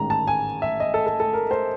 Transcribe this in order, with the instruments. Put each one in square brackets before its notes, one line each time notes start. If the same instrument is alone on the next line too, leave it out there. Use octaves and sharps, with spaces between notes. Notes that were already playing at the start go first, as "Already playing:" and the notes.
Already playing: [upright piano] A1 G#2 D#3 A#5
A5
G#5
E5
D#5
A4
A4
A4
A#4
C5